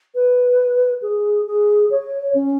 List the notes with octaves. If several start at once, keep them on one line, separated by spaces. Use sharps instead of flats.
B4
G#4
G#4
C#5
C#4